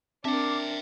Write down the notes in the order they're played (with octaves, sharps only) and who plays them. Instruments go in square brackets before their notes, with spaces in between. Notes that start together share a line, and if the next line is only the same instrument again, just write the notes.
[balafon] C4 [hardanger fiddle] D4 A#4 [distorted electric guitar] E5 G5 [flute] D6